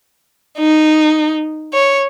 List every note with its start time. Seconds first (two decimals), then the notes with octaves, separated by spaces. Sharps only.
0.58 D#4
1.73 C#5